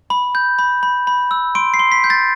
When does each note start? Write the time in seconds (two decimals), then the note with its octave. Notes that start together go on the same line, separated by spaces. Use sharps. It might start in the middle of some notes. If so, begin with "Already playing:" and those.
0.10 B5
0.35 G6
0.59 B5
0.83 B5
1.07 B5
1.31 E6
1.55 C6 D7
1.74 C7
1.79 C6
1.92 B6
2.04 G6
2.10 A6